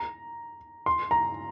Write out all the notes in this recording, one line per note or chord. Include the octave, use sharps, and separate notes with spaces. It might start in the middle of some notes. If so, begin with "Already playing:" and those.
Already playing: A#5
C6
A#5